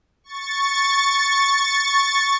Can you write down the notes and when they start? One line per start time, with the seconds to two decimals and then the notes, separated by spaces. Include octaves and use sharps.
0.24 C#6 A6